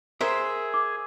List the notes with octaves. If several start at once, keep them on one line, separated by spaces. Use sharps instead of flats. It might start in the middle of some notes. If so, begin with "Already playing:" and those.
G#4 A#4 C5 E5
D6